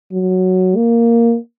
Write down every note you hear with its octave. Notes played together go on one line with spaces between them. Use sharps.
F#3
A#3